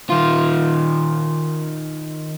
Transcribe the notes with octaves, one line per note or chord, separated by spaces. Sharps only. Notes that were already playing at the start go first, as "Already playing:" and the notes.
D#3 F4